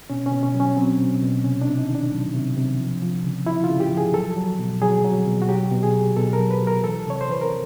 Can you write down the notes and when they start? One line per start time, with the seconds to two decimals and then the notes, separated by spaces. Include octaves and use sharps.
0.10 B2 C#4
0.26 C#4
0.32 B2
0.43 C#4
0.54 F#3
0.60 C#4
0.77 F#3 C4
0.99 B2
1.22 B2
1.44 C3 C#4
1.61 D4
1.67 C3
1.78 D#4
1.89 D#3
1.95 D4
2.12 F#3
2.34 C3
2.57 C3
2.79 F3
3.02 F3
3.25 C#3
3.47 F3 E4
3.64 F4
3.69 C#3
3.80 G4
3.91 F3
3.97 G#4
4.14 F#3 A4
4.36 F#3
4.59 B2
4.82 F#3 G#4
5.05 F#3
5.27 B2
5.42 F#4
5.49 F#3 G4
5.71 B2
5.83 G#4
5.94 F#3
6.17 B2 A4
6.33 A#4
6.39 F#3
6.51 B4
6.62 F#3
6.67 A#4
6.84 E3 A4
7.07 C3 C#5
7.21 C5
7.29 E3 B4
7.41 A#4